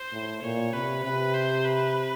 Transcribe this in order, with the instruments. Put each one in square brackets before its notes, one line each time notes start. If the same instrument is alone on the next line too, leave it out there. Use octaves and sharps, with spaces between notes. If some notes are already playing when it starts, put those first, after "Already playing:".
Already playing: [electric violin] C5
[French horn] A2
[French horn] A#2 [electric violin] C#5
[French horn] C3 [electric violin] B4
[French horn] C3 [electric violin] B4
[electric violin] C5
B4